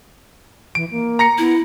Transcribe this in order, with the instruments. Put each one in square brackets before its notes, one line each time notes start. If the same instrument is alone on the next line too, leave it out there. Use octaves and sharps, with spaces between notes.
[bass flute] E3 [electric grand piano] D7
[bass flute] A#3
[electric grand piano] A#5 A#6 C#7
[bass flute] B3 [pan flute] E4